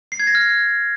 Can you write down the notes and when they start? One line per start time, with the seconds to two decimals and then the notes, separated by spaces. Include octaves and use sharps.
0.12 C7
0.20 G#6
0.27 A#6
0.35 F6